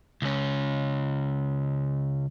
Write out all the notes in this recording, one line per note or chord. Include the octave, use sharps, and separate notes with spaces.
C#2 C#4